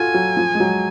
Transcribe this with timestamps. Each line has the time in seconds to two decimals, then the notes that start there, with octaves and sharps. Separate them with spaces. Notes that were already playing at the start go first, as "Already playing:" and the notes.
Already playing: F4 F#4 A4 G#5
0.14 F#3
0.37 F3
0.55 G#3
0.60 F#3